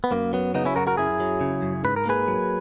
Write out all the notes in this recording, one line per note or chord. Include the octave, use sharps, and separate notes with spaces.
B3
F#2 A#3
F#3 B3
C#3 B3 D#4
C#4 E4
F#2 F#4 A#4
F#4 A#4
F#2 E4 G#4
F#3
C#3
F#2
G#2 B4
A#4
A#3 G#4 B4
F#3